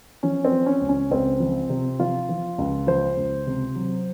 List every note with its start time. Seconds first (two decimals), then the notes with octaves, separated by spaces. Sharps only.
0.23 F3 C#4
0.45 C4
0.52 F3
0.66 C#4
0.82 C#2
0.89 C#4
1.11 C#2 C4
1.40 F3
1.70 C3
1.99 F3 F4
2.29 F3
2.58 C#2
2.87 F3 C5
3.17 C#2
3.47 C3
3.76 F#3